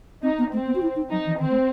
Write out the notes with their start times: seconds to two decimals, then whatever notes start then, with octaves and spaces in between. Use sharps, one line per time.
0.23 C4 D#4
0.38 B3
0.52 A3 C4
0.67 B3
0.75 F#4
0.82 E4
0.96 D#4
1.11 F#3 D#4
1.26 E3
1.40 D#3 C4
1.50 A3